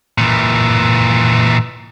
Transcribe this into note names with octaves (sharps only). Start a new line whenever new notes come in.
A#2 E3